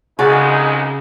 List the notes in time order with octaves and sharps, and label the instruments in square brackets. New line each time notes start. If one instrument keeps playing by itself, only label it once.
[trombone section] C2 G#3 D#4 [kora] C#3 F#4 D5